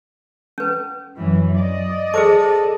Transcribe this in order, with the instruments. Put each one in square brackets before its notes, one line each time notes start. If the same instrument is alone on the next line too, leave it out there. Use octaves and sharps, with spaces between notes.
[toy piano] C#4 B4
[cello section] F#2 E3 F#3
D5 D#5
[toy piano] G#4 C5 D6 [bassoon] A4